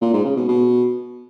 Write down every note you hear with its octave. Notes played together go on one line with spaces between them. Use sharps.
A#2
G#2
C#3
B2
B2